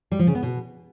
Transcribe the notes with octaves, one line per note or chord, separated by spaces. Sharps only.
G3
F3
C#3
B3
B2